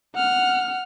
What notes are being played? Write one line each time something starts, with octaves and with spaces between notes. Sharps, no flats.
F#5 F6